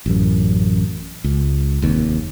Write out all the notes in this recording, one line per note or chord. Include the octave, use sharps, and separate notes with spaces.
A1 F#2
C#2
F1 D#2